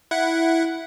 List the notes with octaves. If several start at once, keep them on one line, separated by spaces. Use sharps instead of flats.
E4 F#5